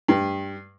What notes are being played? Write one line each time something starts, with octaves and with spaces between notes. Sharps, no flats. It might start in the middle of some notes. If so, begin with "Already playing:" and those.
G2